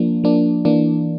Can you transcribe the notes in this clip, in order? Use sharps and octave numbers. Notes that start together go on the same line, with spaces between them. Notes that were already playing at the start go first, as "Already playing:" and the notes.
Already playing: F3 A#3 D4
F3 A#3 D4
E3 A#3 D4